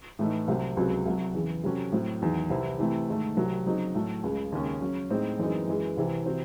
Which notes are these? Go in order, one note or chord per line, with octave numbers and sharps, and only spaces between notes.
A2 E3 A3 D#4
C2 C3 F#3 C4
C#2 C3 F#3 C4 F#4
C2 C3 F#3
E2 C#3 E3
C3 F#3 C#4 F#4 A4
A2 F#3 C4
E2 D#3 F#3
C2 C3 E3 C4 E4
C3 E3 A3 C4 E4
G#2 D#3 A3
C2 C3 F#3 C4
C#3 F#3 C4 D#4
A2 F#3 A3
C#2 C#3 G#3
D#2 C#3 G#3 C#4 G#4
C#3 F#3 C#4
A2 G#3 C4 D#4
F#2 E3 G#3 C4 D#4
F#2 E3 G#3
C2 C3 E3 C4
C3 E3 C4 F#4